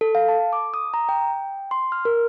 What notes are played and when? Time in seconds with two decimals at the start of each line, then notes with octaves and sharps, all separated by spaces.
0.01 A4
0.15 F5
0.28 A5
0.53 D6
0.74 D#6
0.94 A#5
1.09 G5
1.71 C6
1.92 F6
2.05 A#4